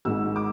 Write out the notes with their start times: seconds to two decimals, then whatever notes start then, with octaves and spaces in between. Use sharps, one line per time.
0.05 G#1 G#2 G#3 E6
0.36 D6